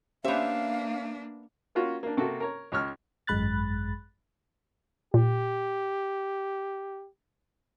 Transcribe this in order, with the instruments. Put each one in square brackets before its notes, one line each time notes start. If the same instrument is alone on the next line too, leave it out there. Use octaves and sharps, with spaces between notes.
[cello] A#3 D4 [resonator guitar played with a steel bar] B3 E5 [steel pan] C#4 G4 C5 [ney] F5
[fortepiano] A#3 C#4 F4 F#4
A#3 D4
C3 A#3 F#4 A4
A#4 C#5
C#2 C#5 F6
[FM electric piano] G#1 F#2 G#3 B5 F#6 A6
[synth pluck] A#2 [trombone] G4